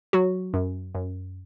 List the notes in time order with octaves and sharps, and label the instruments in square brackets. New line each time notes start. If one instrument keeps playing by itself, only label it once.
[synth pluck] F#3 F#4
F#2
F#2